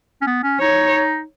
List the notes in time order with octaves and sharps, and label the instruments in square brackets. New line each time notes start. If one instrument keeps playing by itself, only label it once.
[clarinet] C#4
B3
C#4
[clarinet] D#4 [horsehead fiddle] C#5